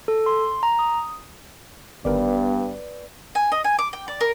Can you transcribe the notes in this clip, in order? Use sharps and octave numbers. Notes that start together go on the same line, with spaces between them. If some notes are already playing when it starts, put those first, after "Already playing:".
A4
C6
A#5
D#6
G1 G2 D#3 B3 A#4 B4 D5
G#5
D#5
G#5
D6
G5
D5
A#4